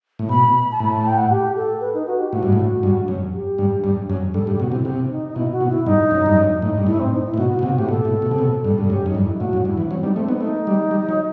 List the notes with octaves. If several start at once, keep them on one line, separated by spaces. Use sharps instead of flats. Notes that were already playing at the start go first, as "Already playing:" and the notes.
A2
B2 B5
A5
A2 B5
A5
G5
F#5
G4
A4
B4
D#4
F#4
G4
A2 F#4
G2
A2
G2
F#2
G4
G2
G2
F#2
G2 A4
G2 G4
B2 F#4
C3 E4
C3
D#4
D#4
B2 E4
F#4
B2
E4
G2 D#4
F#2
G2
F#2
A2
G2
A2 E4
C4
D#4
E4
A2
B2 F#4
F#4
B2
C3 F#4
A2 G4
B2 A4
A2
B2
C3
B2
G2
G2 A4
F#2 G4
F#2 D#4
G2
E4
E4
A2 F#4
F#2
G2 E4
E3
F#3 C4
G3 D#4
A3 C4
B3 D#4
A3 D#4
G3
G3
F#3